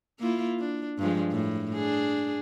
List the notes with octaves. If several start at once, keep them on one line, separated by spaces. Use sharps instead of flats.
A#3 E4 F4
D4
G2 F3 G#3
A2
D4 G#4